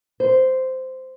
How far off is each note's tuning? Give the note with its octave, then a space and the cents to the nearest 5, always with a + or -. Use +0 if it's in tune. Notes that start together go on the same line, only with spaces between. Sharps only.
C5 -10